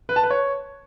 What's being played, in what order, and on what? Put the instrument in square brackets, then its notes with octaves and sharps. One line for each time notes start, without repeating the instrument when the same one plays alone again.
[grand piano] B4
A5
B4
C#5